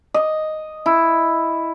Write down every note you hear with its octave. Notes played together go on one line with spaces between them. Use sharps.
D#5
E4